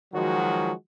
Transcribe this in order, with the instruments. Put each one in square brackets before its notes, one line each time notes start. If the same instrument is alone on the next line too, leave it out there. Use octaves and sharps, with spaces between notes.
[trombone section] D#3 F3 F#3 G#3 F#4